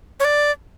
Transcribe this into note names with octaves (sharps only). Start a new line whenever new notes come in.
C#5
D5